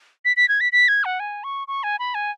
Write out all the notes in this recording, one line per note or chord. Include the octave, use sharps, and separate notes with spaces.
B6
B6
G#6
B6
B6
G#6
F#5
G#5
C#6
C#6
G#5
B5
G#5